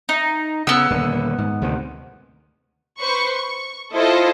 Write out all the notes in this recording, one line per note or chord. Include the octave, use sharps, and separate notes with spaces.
D#4
C#3 B3 E6
D#1 D3
G#2
D2 C3 D#3
B4 C5 C#6
C#6
E4 F4 A4 C5 D#5